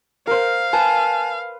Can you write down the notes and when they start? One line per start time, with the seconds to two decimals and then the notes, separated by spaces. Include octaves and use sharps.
0.27 A#4 C5 F5
0.73 B4 G#5 A5